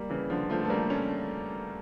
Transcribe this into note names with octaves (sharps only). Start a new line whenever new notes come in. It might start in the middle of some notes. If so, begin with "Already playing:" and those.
Already playing: G3 A#3
C#3 E3
D3 F3
F3 A3
A3
G3 A#3
A3 C#4